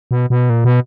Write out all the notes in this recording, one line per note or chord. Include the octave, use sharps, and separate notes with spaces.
B2
B2
A#2
B2